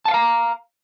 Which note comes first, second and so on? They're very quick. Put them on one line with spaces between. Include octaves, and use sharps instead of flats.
A5 F#5 F5 A#5